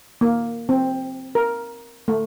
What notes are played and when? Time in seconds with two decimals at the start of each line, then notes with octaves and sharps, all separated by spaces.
0.21 A#3
0.69 C4
1.35 A#4
2.08 A3